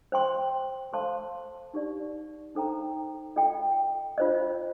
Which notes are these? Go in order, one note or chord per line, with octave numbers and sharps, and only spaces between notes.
C5 G5 C6
A4 C5 F5 A5 C6
D#4 G4 D5
D#4 A4 C5 G5 A#5
F4 A4 D#5 G5
F4 C5 D#5